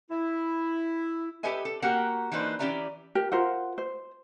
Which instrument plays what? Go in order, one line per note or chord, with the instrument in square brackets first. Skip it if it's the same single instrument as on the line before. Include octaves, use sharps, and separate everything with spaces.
[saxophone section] E4
[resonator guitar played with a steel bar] G4 A4 B4 D#5 E5 G#5
A4
A#3 F#4 G4 A#4 F#5
E3 A#3 D4 D#4 B4 C5
E3 C#4 G4 D5 E5 A#5
[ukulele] G4 A#4
F4 A#4 C5 F#5
C5